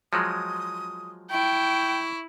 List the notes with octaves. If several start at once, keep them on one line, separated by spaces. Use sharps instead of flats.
F3 F#3 G#3 D#6
E4 G5 C#6